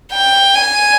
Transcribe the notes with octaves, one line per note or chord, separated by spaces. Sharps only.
G5
G#5